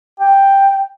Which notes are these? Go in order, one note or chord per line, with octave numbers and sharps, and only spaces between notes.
G5